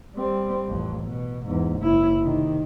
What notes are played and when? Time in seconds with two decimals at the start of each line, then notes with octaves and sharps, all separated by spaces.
0.16 G3 C4
0.67 A1 F2
1.04 B2
1.45 E2 G#2
1.79 F#1 E4
2.21 C3 D#3